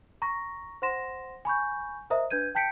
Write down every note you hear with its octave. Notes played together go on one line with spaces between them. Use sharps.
A#5 C#6 A#6
C5 F#5 C6 A#6 E7
G#5 B5 C#6 G6
A#4 C5 D#5 E5 A#5 D#6
D4 B4 G6 G#6 D#7
G5 A5 G6 B6 C#7 D7